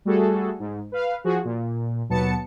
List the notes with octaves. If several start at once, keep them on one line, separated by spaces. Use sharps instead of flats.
G3 A3 F#4 G#4 A4
G#2
B4 F5
F3 F#4 G#4
A#2
D#2 B2 F#3 B3 A5 C#7